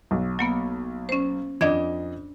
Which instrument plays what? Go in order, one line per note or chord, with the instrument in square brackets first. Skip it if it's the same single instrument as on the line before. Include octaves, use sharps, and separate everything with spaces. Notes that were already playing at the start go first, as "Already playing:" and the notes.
[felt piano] B1
[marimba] F#3 A#3 B3
C#4 C5
[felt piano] F2 D#5 [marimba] D4 D5 G#6